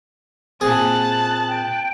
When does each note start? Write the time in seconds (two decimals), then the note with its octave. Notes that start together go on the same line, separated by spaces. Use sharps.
0.61 A#2 C4 G#4 A5 F#6 A6
1.48 G5